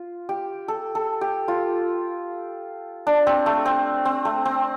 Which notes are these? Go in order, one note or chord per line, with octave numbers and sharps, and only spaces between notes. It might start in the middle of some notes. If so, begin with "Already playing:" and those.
Already playing: F4
G4
A4
A4
G4
F4
D4
C4
A3
C4
C4
A3
C4